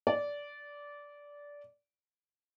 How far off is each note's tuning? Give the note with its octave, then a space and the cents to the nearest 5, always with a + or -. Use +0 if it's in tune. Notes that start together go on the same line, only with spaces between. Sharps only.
D5 -15